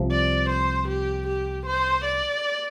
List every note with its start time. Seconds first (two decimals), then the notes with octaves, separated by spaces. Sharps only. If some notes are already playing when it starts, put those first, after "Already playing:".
Already playing: C2 C3 F3
0.11 D5
0.50 C5
0.88 G4
1.27 G4
1.66 C5
2.05 D5